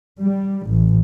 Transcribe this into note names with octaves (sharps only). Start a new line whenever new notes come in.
G3
A1